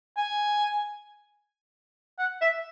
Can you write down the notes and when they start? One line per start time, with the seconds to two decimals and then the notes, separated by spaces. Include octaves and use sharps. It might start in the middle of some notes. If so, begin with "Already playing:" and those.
0.17 G#5
2.19 F#5
2.41 E5